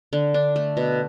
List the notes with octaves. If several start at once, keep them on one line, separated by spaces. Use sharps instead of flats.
D3
D4
A3
B2